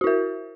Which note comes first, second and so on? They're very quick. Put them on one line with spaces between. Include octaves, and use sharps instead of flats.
F#4 E4 A#4